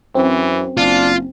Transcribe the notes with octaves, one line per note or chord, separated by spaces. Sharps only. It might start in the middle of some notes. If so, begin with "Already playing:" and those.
F#2 E3 C4
F#1 D4 F4